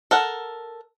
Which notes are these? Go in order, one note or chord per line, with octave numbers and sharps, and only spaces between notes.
A4 A#4 F#5